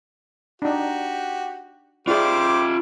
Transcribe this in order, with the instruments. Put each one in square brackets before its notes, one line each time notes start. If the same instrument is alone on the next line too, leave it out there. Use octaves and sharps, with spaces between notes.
[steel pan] D4 D#4 [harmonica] F#4 G4
[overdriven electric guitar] F4 E5 [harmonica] G4 C5 D6 [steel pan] G#4 D5